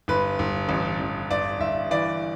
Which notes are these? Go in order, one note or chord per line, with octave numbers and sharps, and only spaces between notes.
G1 B4
G1
A1
A1
G1 D5
G1 E5
E3 D5